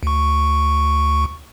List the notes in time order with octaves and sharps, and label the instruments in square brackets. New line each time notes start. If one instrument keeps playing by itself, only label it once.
[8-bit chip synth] D2 C#6